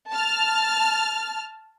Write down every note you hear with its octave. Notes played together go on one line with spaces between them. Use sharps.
A5 F6